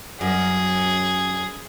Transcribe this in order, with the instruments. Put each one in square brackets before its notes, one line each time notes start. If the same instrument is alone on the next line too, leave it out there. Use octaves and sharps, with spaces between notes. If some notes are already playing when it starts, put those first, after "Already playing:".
[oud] F#2 [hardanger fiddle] G#4